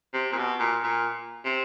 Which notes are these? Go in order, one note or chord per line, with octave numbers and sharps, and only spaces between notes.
C3
A#2
B2
A#2
A#2
C3